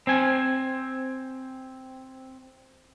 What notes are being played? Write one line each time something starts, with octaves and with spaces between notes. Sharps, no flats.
C4 G#5